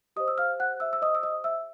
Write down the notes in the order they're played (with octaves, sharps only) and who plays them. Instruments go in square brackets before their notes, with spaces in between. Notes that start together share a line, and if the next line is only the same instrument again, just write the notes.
[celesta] G4 D#5 D#6
C5
E6
F5 F6
F#5 F#6
E5 E6
E6
D#5 D#6
E6
D#5 D#6
E5 E6